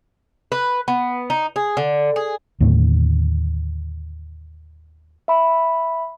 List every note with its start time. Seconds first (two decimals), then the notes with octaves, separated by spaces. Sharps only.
0.52 B4
0.88 B3
1.30 D#4
1.56 G#4
1.77 D3
2.16 G#4
2.60 D#2 A2 D3 A3
5.28 E5 B5